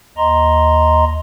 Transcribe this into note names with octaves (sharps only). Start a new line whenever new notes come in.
D#2 D#5 A#5 C6